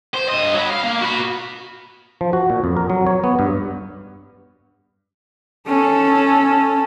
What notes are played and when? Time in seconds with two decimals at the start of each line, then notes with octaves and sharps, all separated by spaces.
0.14 C5
0.29 G2 D#5
0.54 F#3 B5
0.70 F5
0.84 A#3
1.01 F#4 B5
2.21 F3
2.33 F#4
2.50 A#2
2.64 F2
2.77 A#4
2.90 F#3
3.07 C#5
3.24 B3
3.39 G2
5.67 C#4 A4